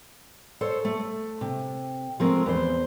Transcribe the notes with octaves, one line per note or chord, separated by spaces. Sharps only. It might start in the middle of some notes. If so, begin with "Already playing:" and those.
A4 C5 C#5
A3
C3
F3 G#3 A3 C4 A#4
E2 C5